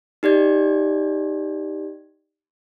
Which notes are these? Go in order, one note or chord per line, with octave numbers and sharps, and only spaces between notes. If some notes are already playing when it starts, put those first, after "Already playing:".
D#4 G4 D5 G#6